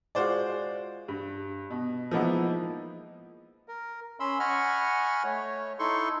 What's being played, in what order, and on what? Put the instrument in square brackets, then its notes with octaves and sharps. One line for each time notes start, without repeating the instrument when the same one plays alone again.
[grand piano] G#3 F4 F#4 C5 D5
G2
B2
F3 G#3 A#3 B3 D#4 E4
[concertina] A#4
C#4 B5 C6 E6
D#5 F#5 G#5 B5 C#6 F6
A3 C#5
D#4 E4 A4 C6 C#6